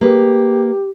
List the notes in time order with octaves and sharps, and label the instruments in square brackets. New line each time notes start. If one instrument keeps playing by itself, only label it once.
[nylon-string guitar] A#3 G#4 B4 [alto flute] G4